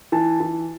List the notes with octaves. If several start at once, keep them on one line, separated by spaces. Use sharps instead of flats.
E3 A5
E3